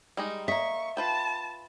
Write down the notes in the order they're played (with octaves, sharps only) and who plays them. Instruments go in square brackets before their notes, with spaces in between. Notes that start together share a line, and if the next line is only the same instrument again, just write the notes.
[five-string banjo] G3 G#3 D#4
[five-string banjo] A#3 D#5 [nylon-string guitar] E5 [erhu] C#6
[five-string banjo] F4 B4 G5 [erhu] A5